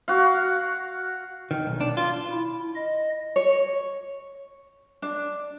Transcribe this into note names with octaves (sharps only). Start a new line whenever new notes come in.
F#4 F5
D#3
B1
D4
F4
E4
D#5
C#5
D4